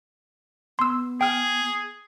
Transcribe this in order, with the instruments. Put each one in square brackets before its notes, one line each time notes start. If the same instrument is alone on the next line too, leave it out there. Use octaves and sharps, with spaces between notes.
[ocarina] B3 [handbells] C6 E6
[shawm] G#4 [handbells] G5 F6